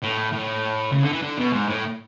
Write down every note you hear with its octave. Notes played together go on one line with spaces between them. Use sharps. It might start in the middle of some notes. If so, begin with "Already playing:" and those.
A2
A2
C#3
D3
E3
D3
B2
G#2
A2